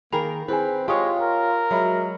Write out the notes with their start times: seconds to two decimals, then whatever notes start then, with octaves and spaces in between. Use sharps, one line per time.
0.13 D#3 A#3 G#4 A#4 G5 B5 F7
0.48 C4 E4 G#4 B4 G#5
0.88 G#3 F4 G4 C#5 G5 C#6 D#6
1.22 A#4
1.71 F#3 G#3 F#4 E5 B5